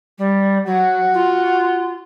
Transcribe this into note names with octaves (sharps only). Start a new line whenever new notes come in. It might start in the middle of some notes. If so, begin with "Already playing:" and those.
G3
F#3 F#4 F#5
F4